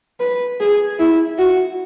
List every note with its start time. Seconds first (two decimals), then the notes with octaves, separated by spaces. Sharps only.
0.20 B4
0.60 G#4
0.99 E4
1.38 F#4